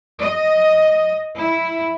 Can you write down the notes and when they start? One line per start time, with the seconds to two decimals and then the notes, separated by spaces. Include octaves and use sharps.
0.20 D#5
1.36 E4